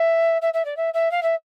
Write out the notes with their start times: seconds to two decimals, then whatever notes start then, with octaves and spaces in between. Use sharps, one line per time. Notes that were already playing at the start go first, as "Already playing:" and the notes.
Already playing: E5
0.42 E5
0.54 E5
0.65 D5
0.77 E5
0.94 E5
1.11 F5
1.23 E5